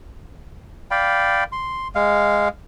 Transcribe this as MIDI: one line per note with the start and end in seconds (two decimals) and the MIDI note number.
0.91 1.44 74
0.91 1.44 77
0.91 1.44 79
0.91 1.44 83
1.52 1.88 84
1.95 2.48 56
1.95 2.48 77